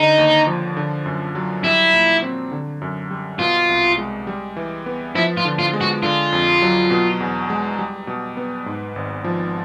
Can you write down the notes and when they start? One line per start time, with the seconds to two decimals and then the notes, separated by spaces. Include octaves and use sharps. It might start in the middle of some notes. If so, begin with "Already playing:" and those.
Already playing: D3 D#4
0.18 D#2
0.47 F3
0.77 D3
1.06 F#2
1.35 F#3
1.64 G3 E4
1.93 A#2
2.22 C4
2.52 D3
2.82 F#2
3.11 G3
3.39 B2 F4
3.69 C2
3.98 G#3
4.27 G3
4.56 E3
4.86 B3
5.15 F3 E4
5.37 F4
5.45 D3
5.59 F4
5.73 G#3
5.81 F#4
6.03 D3 F4
6.32 F2
6.62 F#3
6.90 B2
7.20 E2
7.50 G#3
7.79 G3
8.07 B2
8.37 B3
8.66 G#2
8.96 G#1
9.24 F3